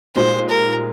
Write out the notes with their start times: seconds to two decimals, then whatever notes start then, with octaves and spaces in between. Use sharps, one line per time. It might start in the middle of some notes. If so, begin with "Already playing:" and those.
0.16 A#2 G#3 D#4 G4 C5
0.49 A#4